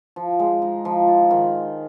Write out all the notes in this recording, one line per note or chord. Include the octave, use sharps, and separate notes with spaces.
F3
G#3
D#4
F3
F4
D#3